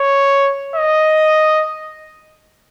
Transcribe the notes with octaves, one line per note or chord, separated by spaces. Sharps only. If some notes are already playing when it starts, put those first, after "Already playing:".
Already playing: C#5
D#5